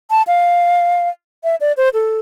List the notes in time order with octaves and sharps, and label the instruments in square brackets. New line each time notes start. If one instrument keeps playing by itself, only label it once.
[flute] A5
F5
E5
D5
C5
A4